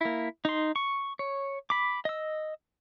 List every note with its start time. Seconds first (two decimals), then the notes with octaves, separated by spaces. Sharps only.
0.01 A#3 E4
0.45 D#4 C6
0.76 C#6
1.19 C#5
1.70 B5 D6
2.05 D#5 E6